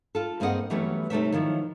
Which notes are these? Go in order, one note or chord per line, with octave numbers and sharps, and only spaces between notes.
F4 A4
G2 A#3 C4 G#4 D#5 F#5
E3 F#3 G3 A3 B3 C#4
C3 G3 A3 D#4 C#5 E5
D#3 F3 F#3 E4